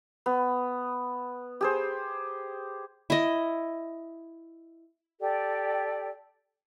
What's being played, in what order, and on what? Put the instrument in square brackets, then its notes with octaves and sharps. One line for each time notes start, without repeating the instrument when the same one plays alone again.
[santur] B3
G4 G#4 C5
[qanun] E4 D#5
[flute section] G4 A4 D5 G5